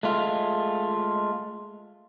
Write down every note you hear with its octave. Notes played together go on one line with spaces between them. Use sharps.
G#3 A3 F4